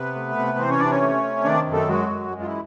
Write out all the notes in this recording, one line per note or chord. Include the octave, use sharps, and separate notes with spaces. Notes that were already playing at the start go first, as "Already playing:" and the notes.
Already playing: C3 B3 B4
A3
C3
E3 C4 C5
C#4 C#5
C3 D4 D5
C#4 C#5
A3
C3
D#3 D4 D5
F#2
A3 A4
F#3 G#3 F#4
F#2
G#3
F4
E3 E4